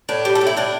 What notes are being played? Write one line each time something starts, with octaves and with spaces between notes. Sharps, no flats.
A2 D4
G3
A4
A2
E4
A2 D4